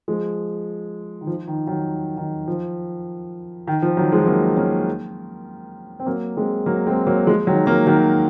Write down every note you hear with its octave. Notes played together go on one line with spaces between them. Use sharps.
F3 G#3
D#3
F3
D#3
D#3 F#3
D#3
F3
D#3
F3
D#3 F#3
F3 G#3
F#3 A#3
A#3 C#4
C4
F#3 A#3
G#3 C4
F#3 A#3
G#3 C4
F#3 A#3
F3 G#3
D#3 F#3
F#3 A#3
D#3 F#3